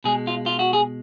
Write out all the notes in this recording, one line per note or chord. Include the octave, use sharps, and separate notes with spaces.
B2 G#3 G#4
F4
F4
F#4
G#4